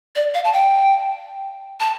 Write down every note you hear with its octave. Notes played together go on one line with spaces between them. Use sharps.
D5
F5
A5
G5
A5